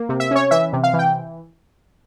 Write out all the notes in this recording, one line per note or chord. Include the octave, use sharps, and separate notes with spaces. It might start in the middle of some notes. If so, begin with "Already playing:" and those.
Already playing: A#3
C3
E5
C#4 C#5
E3 E5
C3
F5
E3
G5